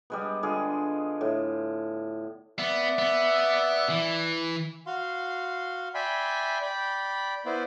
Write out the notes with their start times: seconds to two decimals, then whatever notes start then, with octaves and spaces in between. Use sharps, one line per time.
0.10 G3 G#3 B3
0.43 D3 G#3 F4 G#4
1.21 A2
2.59 B3 D5 E5
2.99 B3
3.90 E3
4.87 F#4 F5 C6
5.94 D5 E5 G5 G#5 B5 C6
6.62 D5 G5 B5
7.45 B3 E4 C5 D5